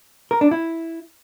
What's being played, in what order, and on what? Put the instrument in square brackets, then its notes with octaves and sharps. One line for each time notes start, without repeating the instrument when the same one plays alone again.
[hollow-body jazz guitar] A#4
D4
E4